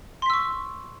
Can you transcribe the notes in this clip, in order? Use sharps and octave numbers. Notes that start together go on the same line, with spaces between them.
C6 C#6 E6 B6